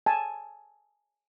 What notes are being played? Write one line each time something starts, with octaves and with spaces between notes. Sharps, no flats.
G#5 A5